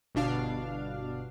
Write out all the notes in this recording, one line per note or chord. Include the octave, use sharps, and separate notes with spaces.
G1 B2 D4 F5